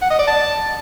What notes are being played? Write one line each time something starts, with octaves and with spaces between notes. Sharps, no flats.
F#5
D#5
D5
A5